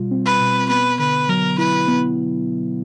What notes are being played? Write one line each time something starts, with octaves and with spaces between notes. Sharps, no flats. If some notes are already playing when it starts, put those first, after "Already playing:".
Already playing: B2 G3 F4
C4
B4
B2
B3 B4
D3 B4
F#3 A#4
E4 B4
B3